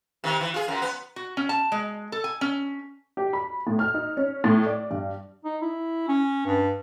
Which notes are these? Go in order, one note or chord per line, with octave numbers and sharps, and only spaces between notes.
C3 D#3
E3
F4 G#4
F#2
B3
F#4
C#4
A5
G#3
A4
G#5
C#4
G4
B5
A2
F6
D#4
C#4
A2
D5
G2
D#4
E4
C#4
G2